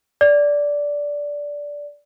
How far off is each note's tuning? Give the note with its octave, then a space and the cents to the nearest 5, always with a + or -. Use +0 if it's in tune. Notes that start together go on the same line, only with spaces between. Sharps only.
D5 -10